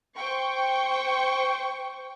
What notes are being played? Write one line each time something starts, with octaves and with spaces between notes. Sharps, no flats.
C5 G5 C#6